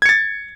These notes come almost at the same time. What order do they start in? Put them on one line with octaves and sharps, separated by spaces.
G#6 C#7 A6